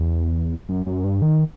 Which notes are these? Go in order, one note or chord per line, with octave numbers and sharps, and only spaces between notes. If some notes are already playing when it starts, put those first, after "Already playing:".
Already playing: E2
F#2
F#2
G2
D#3